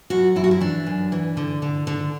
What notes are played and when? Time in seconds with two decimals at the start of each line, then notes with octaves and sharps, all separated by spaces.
0.10 F#2 F#4
0.36 F#2 E4
0.44 F#4
0.51 E4
0.61 E3 D4
0.86 F#2
1.12 E3
1.37 D3
1.62 D3
1.87 D3